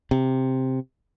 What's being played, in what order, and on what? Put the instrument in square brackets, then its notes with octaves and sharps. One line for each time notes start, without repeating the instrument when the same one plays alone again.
[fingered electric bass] C3